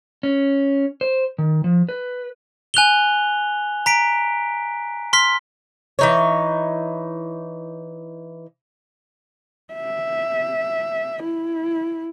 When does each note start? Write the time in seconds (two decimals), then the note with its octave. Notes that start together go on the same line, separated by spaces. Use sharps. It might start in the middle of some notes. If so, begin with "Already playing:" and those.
0.23 C#4
1.01 C5
1.38 D#3
1.64 F3
1.89 B4
2.74 G#5 F#6 F7 G7
3.86 A#5 B6 D7
5.13 C6 F6 B6
5.99 E3 D#4 C#5
9.74 E5
11.24 E4